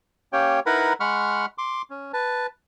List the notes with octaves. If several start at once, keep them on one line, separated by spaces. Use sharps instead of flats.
A#3 C#4 G4 C#5 G5
D#4 E4 A#4 B4 F#5 B5
G#3 F#5 B5 C#6 F6
C6 D6
C#4
B4 A5